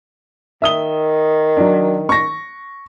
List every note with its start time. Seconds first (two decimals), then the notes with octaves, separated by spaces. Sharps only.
0.62 D#3 E5 D#6 G7
1.57 F#3 D4
2.09 C#6 A#6